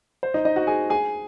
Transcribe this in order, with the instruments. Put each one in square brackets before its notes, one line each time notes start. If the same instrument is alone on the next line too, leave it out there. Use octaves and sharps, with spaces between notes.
[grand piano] C5
D#4 D#5
D#4 D#5
F#4 F#5
G#4 G#5
G#4 G#5